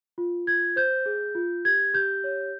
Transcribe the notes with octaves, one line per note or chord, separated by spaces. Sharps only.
F4
F4 G#6
C5 G6
G#4
F4
G4 G#6
G4 G6
C#5